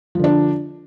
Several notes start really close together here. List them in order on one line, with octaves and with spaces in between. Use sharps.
F3 D3 D4